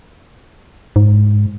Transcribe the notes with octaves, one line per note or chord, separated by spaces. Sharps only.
G#2